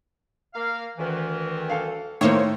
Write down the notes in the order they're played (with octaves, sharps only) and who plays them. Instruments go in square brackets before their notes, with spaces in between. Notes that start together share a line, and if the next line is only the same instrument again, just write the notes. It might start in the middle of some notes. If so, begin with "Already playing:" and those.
[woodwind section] A#3 F5
D2 D#3 E3
[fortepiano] A4 F5
[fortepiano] A2 D#3 [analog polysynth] A#3 C5 C#5